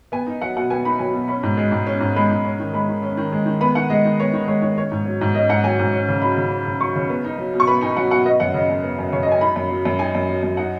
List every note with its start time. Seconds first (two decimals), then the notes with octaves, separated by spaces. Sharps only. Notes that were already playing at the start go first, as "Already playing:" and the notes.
0.12 B3 G#5
0.26 D#4
0.41 F#3 F#5
0.57 B2 F#5
0.70 B3 G#5
0.85 D#4 B5
0.99 F#3 G#5
1.14 B2
1.28 C#4 B5
1.43 G#2
1.57 G#3
1.72 G#2
1.86 C#4
2.01 G#2
2.16 G#3 B5
2.31 G#2
2.44 C#4
2.60 D#3
2.74 G#3 B5
2.89 D#3
3.03 C#4
3.17 D#3
3.32 G#3
3.46 D#3
3.61 B3 B5
3.75 D#3 F#5
3.90 G#3 D#5
4.05 D#3
4.19 B3 C#5
4.33 D#3
4.47 G#3 C#5
4.62 D#3 C#5
4.77 C#4 C#5
4.92 G#2
5.06 F#3
5.21 G#2
5.35 C#4 D#5
5.49 G#2 F#5
5.64 F#3 G#5
5.79 G#2
5.93 C#4
6.08 C#3
6.22 F#3 B5
6.37 C#3
6.51 C#4
6.66 C#3
6.80 F#3 C#6
6.95 C#3
7.09 B3
7.24 D#4
7.38 F#3
7.54 B2
7.60 C#6
7.67 B3 B5
7.81 D#4 G#5
7.97 F#3 F#5
8.11 B2 F#5
8.26 B3 D#5
8.40 F#2 F#5
8.54 C#3 D#5
8.69 F#2
8.83 B3
8.99 F#2
9.12 C#3 C#5
9.23 D#5
9.27 F#2 G#5
9.41 D#4 B5
9.56 F#2
9.70 F#3
9.85 F#2
9.99 D#4 G#5
10.15 F#2
10.29 F#3
10.43 F#2
10.57 D#4 F#5